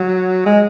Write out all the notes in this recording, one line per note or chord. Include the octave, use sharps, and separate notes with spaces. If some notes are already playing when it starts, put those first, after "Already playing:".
Already playing: F#3
G#3